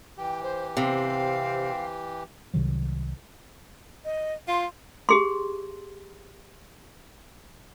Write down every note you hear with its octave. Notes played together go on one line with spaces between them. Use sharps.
E3 G4 G5
C5
C3 C4 F5
C2 C3 D#3 F#3
D#5
F4 C6
G4 G#4 C6